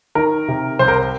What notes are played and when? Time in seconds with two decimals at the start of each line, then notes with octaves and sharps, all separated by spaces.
0.15 D#3 A#4
0.48 C3
0.79 C2 C5
0.88 A#4